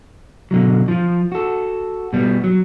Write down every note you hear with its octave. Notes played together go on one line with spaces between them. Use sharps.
B2 D3 F3 F#3
F3 F4
F#4 A4
B2 G3 B3
F#3